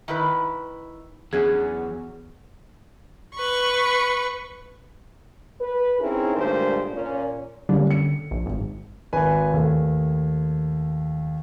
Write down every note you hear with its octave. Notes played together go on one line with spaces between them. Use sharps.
D#3 E4 B4
E2 F#3 C#4 G#4
B4 C#6
B4
C4 C#4 D#4 E4 G#4 A#4
D2 G2 A#2 G#3 A3 C5
A#2 C#4
D3 G3 A#3 C#4
C#7
A#1
G#1
G#1 B4 G#5
D#2 A3